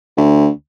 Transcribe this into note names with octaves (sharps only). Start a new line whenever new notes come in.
D2